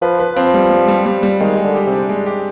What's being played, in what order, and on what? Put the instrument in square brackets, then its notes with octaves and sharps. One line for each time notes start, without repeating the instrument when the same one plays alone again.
[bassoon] F3 [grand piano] B4
[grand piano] B4
[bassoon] F3 [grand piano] C4
[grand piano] G3
G3
G3
G3
G3
[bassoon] D#3 [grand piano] G#3
[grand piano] G#3
[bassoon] D3
[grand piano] G4
[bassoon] C3
[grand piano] D4
G#3
G4